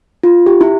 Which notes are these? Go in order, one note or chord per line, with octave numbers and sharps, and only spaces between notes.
F4
G4
E4